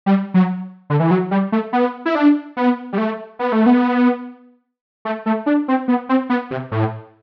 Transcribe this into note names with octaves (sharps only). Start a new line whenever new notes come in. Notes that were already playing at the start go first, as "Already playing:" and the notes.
G3
F#3
D3
E3
F#3
G3
A3
B3
E4
D4
B3
G3
A3
B3
A3
B3
A3
A3
D4
C4
B3
C4
B3
C3
A2